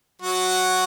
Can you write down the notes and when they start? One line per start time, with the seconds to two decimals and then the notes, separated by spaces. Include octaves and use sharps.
0.22 F#3 F#4